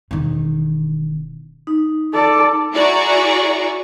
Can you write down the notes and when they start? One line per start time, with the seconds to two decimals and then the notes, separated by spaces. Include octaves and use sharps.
0.11 E1 D#3
1.67 D#4
2.13 A4 D5
2.73 E4 F#4 G#4 D5 A#5 C#6